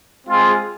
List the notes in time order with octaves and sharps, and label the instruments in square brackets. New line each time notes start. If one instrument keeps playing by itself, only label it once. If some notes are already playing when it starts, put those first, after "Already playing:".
[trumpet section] G#3 C4 F4 G#4